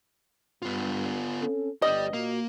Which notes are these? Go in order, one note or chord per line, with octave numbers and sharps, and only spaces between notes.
G2 B3 F4
C4 C#4 A4
G1 B3 D4 G4 D5 D#5
A#2 A#3 F#4